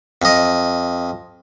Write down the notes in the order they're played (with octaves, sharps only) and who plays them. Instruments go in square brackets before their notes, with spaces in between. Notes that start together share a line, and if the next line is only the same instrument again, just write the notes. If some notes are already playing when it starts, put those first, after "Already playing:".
[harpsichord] F2 D#5